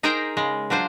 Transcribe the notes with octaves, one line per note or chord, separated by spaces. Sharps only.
D#4 G#4 A#4 C5 G5 A#5
C#3 G#3
F#3 D4 F4 C5